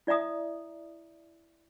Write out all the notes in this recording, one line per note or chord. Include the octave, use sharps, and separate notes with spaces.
E4 D5 E5 A#5 D#6